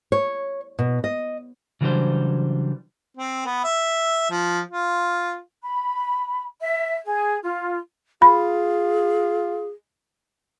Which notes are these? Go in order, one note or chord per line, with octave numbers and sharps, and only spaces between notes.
C#5
B2
D#5
C#3 E3 F#3 G3 D4 C5
C4
B3
E5
F3
F4
B5
E5
G#4
F4
F4 G#4 B5